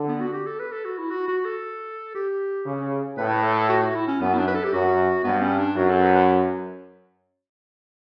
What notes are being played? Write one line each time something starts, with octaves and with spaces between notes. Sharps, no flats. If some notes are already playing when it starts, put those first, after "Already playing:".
Already playing: D3
B3
F#4
G4
A4
B4
A4
F#4
E4
F#4
F#4
A4
G4
C#3
A2 B4
A4
F#4
F#4
E4
C#4
F#2 B3
E4
D4
B4
A4
G4
F#2 F#4
G2 B3
C#4
D4
F#2 F#4
A4
B4
B4